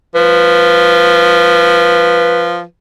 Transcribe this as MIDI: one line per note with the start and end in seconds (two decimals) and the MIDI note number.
0.15 2.63 53
0.15 2.64 71